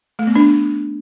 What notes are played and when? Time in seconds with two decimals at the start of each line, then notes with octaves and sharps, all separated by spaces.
0.19 A3
0.27 B3
0.36 D4